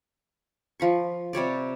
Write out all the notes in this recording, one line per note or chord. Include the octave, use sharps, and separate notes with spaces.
F3 B5 C#6
C3 G3 C#5 D5